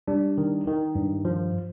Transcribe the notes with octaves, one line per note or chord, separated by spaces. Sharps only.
G3 D4
D#3
D#3
G2
F3